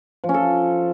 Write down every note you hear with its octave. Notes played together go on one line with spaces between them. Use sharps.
F3
C#4
A4